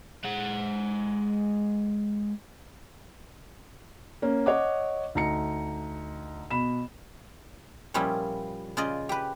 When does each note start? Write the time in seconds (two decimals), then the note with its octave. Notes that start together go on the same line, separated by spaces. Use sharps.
0.24 G#3 F#5
4.22 A#3 C#4
4.46 C#5 D#5 F#5 D6
5.15 D2 D#4 A#5 C#7
6.51 B2 B5 E7
7.94 A#2 F3 G3 C#4 E4
8.77 C#3 F4 D5 D#5
9.09 G4 B4